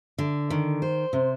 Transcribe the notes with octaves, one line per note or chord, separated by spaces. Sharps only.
D3
D#3
C5
C3